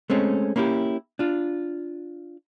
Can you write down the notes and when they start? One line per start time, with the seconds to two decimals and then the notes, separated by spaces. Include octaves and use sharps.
0.10 G#3 A3 C4 C#4
0.56 A#3 C#4 E4 F4 G4
1.19 D4 F4